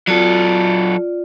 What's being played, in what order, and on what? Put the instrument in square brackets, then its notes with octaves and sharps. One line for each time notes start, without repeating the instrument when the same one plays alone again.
[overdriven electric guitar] F#3 A4 [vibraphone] F4 D5